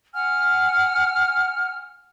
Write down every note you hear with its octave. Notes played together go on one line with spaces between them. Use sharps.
F#5 G#5 F6